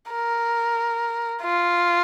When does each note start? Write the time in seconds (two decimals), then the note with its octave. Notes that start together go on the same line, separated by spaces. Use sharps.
0.11 A#4
1.43 F4